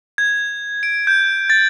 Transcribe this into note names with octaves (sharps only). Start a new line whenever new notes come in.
G#6
D7
G6
A6